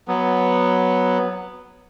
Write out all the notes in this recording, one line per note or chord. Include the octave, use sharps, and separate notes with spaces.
F#3 B3